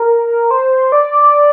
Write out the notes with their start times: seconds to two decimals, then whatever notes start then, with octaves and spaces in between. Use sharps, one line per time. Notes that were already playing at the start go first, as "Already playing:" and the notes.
Already playing: A#4
0.51 C5
0.92 D5